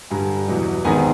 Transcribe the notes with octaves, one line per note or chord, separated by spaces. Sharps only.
G2 D3 G3 G#5 A#5
E2 B2 F#3
G#1 G#2 D#3 G#3 B3 G#5 A#5